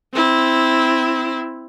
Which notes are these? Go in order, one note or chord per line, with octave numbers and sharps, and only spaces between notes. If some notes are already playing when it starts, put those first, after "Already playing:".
C4 E4